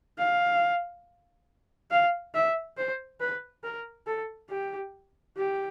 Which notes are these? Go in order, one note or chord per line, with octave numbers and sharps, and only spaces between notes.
F5
F5
E5
C5
B4
A#4
A4
G4
G4